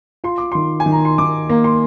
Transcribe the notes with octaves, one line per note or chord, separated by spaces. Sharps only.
F4 C6
D6
D#3 C6
G#5
D#3
A#5
C6
D#3 D6
A#3
C6